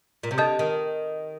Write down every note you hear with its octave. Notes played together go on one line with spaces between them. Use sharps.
A#2
C3
D3 D#5 A5 D#6 G6
D#3